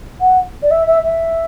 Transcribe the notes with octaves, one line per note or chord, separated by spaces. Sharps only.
F#5
D5
E5
E5
E5